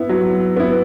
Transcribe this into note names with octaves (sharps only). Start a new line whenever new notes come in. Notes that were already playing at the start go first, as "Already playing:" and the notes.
Already playing: B3 E4
F#3
B3 E4